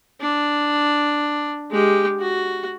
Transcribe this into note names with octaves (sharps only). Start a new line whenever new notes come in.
D4
G#3 G4
F#4